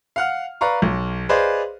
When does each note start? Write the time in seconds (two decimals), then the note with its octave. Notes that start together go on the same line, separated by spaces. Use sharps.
0.16 F5 F#5 F6
0.61 B4 D5 F5 A#5 C#6
0.82 B1
1.29 G#4 B4 C5 D5 D#5 F5